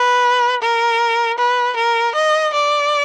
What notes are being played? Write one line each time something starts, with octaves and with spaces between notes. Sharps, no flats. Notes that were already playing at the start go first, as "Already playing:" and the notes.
Already playing: B4
A#4
B4
A#4
D#5
D5